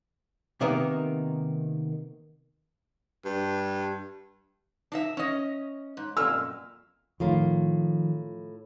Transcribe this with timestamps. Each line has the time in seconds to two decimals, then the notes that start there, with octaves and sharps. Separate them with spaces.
0.61 C3 D#3 A#3 B3 D#4
3.25 G2
4.92 D4 D#4 E5
5.17 C#4 D#5
5.97 G#2
6.17 F#2 A#2 E6 F6
7.20 A2 D#3 F3 F4 A#4